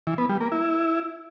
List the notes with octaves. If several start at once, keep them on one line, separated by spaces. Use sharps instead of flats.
E3
B3
G3
A#3
E4